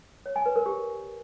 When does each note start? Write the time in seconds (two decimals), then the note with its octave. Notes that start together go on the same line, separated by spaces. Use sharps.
0.26 C#5
0.36 G#5
0.46 B4
0.56 A#4
0.66 G4